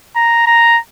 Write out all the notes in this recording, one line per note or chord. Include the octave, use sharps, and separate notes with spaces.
A#5
A#5